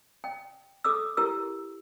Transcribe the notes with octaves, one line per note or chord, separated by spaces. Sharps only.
G5
A4 D6 E6
E4 G4 A#4 E6